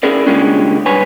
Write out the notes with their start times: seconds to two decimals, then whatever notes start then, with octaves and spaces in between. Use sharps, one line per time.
0.03 C#4 E4 G#4 A#4 D5
0.26 C#3 G3 G#3 A#3 C#4 D4
0.86 B1 G2 B4 C#5 G#5